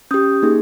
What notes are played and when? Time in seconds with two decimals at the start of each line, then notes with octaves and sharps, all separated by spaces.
0.11 C#4 G4 D#6 G6
0.43 A#3 D#4 G#4